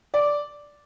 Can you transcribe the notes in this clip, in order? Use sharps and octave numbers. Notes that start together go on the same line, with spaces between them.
D5